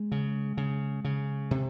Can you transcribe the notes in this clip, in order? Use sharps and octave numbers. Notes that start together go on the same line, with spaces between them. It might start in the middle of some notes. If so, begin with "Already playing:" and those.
Already playing: G#3
C#3
C#3
C#3
C3